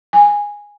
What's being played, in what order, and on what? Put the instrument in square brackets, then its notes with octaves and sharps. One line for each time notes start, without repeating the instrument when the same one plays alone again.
[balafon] G#5